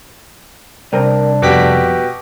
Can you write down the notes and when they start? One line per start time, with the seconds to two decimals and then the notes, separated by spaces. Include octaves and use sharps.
0.93 C2 C4 D4 A#4
1.42 F2 B2 G4 D6 B6